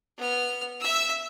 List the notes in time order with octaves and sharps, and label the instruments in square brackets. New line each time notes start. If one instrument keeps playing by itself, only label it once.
[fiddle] B3 F6
E5 E6